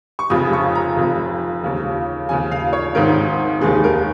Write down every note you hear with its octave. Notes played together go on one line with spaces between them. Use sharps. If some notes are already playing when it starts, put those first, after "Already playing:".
C#6
F1 F2 C#3 F3 D#6
C#6
A#5
F1 F2 F3
D#2 C#3 F3
D#2 C#3 F3 G#5
F5
C#5
G#1 G#2 D#3 A#4
F1 D#2 D#3 G#4
A#4